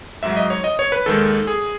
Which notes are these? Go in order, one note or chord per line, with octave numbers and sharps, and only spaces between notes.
G#2 F#3 E5
D#5
C#5
D#5
C#5
B4
D#2 D#3 G#3 A4
G#4